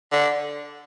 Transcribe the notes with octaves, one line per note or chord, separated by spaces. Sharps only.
D3